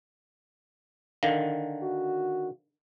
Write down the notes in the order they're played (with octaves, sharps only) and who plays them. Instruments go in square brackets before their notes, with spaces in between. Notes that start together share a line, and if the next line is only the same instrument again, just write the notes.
[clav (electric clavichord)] D3 D#3 [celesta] F5
[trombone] F#4